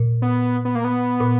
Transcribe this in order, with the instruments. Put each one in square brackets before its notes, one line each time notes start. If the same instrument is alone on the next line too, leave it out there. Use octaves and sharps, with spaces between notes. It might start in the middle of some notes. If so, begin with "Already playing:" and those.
Already playing: [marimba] A#2
[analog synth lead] B3
B3
A#3
B3
[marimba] A#2